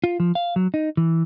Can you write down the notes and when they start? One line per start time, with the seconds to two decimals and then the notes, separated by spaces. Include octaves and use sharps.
0.04 F4
0.20 F3
0.35 F5
0.56 F#3
0.74 D#4
0.97 E3